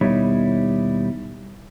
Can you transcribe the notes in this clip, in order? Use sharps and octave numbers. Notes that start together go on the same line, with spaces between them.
D#2 B2 G3 D#4 E4 C#5